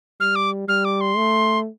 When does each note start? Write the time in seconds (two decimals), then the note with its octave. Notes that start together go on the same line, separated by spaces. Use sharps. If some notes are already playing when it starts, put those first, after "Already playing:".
0.20 G3 F6
0.35 D6
0.68 G3 F6
0.85 D6
1.01 C6
1.17 A3